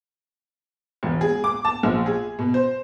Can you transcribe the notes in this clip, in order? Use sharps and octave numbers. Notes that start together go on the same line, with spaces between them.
E1
G#4
D6
A5
A#1
G#4
B2
C5